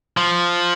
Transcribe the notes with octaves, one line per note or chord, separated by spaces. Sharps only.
F3